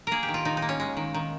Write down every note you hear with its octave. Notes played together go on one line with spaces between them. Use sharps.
A#3 G#4 A#4
G4
D#3
F4
D#3 D#4
D#4
A#3
C#4
G#3
D#3
D#3